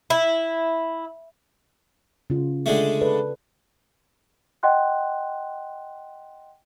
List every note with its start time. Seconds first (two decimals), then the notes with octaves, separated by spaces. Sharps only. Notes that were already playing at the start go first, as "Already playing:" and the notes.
0.10 E4
2.30 C#3 F4
2.66 D3 G#3 A3
3.01 A4 B4 D5
4.63 D#5 F#5 G5 C6 F#6